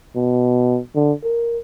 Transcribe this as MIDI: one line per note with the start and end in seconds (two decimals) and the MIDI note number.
0.16 0.78 47
0.95 1.13 50
1.24 1.58 70